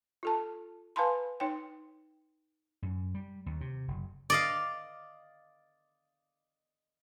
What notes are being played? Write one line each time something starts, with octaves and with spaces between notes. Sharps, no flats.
F4 A4 A5
B4 F5 G#5 A5 B5 C6
D#4 C#5 G5
F#2
G3
D#2
C3
F#1
D5 D#5 F5